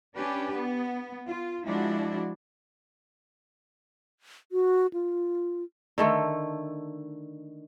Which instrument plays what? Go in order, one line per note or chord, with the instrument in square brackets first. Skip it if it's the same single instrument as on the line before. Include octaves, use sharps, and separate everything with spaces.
[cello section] C#4 D4 G4 B4
B3
F4
F3 G#3 D4 E4 F#4
[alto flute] F#4
F4
[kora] D3 D#3 A3